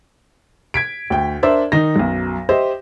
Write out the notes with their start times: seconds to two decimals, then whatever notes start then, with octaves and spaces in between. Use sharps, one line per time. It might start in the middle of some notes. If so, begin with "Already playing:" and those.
0.74 G#6 B6 D7
1.10 D2 G5
1.43 D4 A#4 C5 D5 E5
1.72 D#3 D#4 A#6
1.96 B1 F#2
2.49 G4 C5 D#5 E5